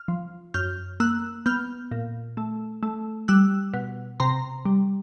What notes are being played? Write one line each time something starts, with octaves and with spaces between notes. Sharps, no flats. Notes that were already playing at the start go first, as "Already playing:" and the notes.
Already playing: F6
F3
F#2 F6 G6
A#3 E6 F#6
B3 F6 G6
A#2
A3
A3
G3 E6 F#6
B2
C3 A#5 C6
G3